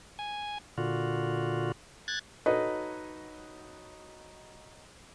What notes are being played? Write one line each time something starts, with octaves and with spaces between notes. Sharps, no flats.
G#5
A#2 D3 F4 F#4
F#6 G#6 A6
D#4 F#4 A4 B4 C#5 D#5